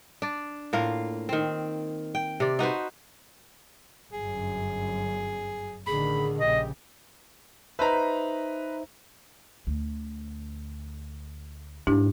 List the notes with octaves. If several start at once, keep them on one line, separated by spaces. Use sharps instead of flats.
D4 D5
A2 A#3 F4 F5
D#3 C4
G5
C3 D5
D#4 F#4 B4 C5
G1 F#2 G#4
A1 D3 D#3 G#4 B5
A#1 C#3 G4 D#5
D#4 B4 C5 E5 A#5
D2
G#2 D4 E4 G4